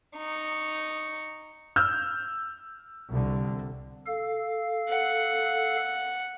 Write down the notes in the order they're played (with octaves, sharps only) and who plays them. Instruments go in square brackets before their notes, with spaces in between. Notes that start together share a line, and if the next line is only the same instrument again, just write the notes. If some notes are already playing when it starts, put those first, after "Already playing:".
[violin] D#4 C#6
[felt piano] E6 F6 G6
[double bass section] C2 D3
[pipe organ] A4 F5
[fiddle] F#5